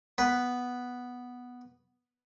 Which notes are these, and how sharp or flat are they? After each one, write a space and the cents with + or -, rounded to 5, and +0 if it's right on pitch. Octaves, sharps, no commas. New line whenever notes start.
B3 +0 B4 +0